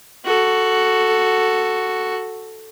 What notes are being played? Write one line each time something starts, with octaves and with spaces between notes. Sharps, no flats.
F#4 A4